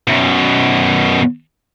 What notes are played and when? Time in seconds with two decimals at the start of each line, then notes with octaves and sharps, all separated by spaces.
0.08 F#2 B2